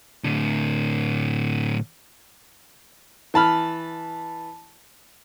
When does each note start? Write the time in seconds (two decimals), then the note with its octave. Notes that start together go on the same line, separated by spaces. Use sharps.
0.24 A2 D3
3.34 E3 A5 B5 F6